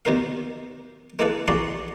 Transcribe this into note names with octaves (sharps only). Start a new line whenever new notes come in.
D#2 B2 D#4 A#4 F5
G#3 A#3 E4 G#4 A4 B4
A1 F#4 G#4 D5 A#5 C6